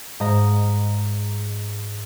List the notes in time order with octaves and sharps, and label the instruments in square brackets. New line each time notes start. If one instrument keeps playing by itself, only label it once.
[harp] G#2 D#5 A#5